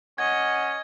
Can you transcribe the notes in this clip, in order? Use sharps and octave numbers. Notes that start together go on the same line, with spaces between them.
C#4 D#5 F#5 G#6